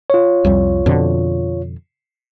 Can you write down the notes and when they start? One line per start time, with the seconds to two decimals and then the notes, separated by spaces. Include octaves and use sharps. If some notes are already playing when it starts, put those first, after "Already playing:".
0.10 F4 C#5
0.45 C2 F2 G3
0.86 F2 B2 D3